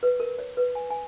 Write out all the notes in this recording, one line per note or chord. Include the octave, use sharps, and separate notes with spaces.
B4
A#4
C#5
B4
G#5
G#5